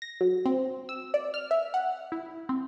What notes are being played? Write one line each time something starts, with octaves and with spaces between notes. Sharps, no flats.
A#6
F#3
C4
E6
D5
F6
E5
F#5
E4
C4